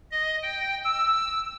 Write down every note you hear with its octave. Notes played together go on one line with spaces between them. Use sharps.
D#5
G5
E6